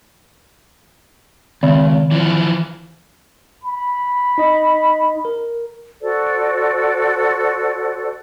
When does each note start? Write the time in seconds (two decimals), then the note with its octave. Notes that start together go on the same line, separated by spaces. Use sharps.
1.63 C#2 D#3
2.11 E3 F3
3.64 B5
4.38 D#4 D#5
5.25 A#4
6.01 F#4 A4 C5 D5